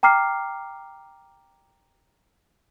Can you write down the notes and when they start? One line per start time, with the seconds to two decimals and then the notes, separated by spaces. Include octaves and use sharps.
0.03 G5 A#5 D6 F6 C7